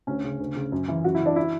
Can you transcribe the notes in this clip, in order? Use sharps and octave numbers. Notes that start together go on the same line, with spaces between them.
D2 C#4
C#3
D2
C#3
F#2
E3
F#2 F#4
E4
E3
D4
E4